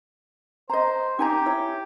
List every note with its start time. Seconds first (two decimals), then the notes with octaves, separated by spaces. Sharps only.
0.69 C5 D#5 A#5
1.19 D#4 G4 G#5 A#5
1.46 E4 C#5